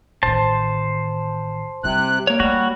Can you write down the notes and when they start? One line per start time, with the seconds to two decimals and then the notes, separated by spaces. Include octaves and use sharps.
0.23 A1 D#3 C5 A5
1.84 C3 G3 E4 F#6
2.27 A#3 C#5
2.40 G3 A3 F#4